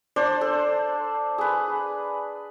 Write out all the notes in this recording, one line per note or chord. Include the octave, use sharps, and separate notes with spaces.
D4 C5 D5
A4
G#4 B4